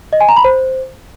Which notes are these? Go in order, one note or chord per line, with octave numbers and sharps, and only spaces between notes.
D#5
G#5
A#5
B5
C5